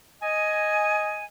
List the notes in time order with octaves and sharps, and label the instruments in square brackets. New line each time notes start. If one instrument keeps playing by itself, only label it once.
[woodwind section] D#5 G#5